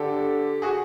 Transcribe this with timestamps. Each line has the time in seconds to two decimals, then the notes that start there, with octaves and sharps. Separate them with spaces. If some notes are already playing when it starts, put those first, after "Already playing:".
Already playing: D3 G4 A4
0.62 F#4 G#4